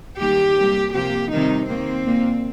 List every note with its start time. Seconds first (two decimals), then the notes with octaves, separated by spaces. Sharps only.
0.20 D#3 G3 A#3 G4
0.57 C3 G3 A#3
0.94 C3 F3 A#3 G4
1.31 C3 D#3 G3 D#4
1.68 D#3 A#3 C4
2.06 A#2 A#3